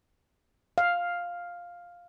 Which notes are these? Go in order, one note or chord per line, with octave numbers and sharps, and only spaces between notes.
F5